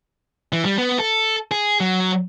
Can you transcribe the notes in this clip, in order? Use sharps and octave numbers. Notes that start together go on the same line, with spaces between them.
E3
G3
B3
A4
G#4
F#3